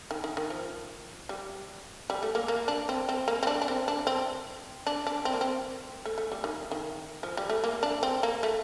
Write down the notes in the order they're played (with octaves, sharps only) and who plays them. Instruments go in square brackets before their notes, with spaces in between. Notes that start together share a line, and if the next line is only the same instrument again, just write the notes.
[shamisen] D#3
D#3
D#3
F3
G3
G3
A3
A#3
A#3
D4
C4
C4
A#3
C4
D4
D4
C4
D4
C4
D4
D4
C4
A#3
C4
A3
A3
G3
D#3
D#3
F3
G3
A3
A#3
D4
C4
A#3
A3